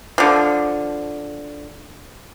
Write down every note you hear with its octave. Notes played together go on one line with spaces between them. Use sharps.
D3 F3